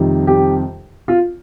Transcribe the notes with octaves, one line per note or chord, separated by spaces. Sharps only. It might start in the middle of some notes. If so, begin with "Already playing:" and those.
Already playing: F2 C3 D#3 G3
G4
F4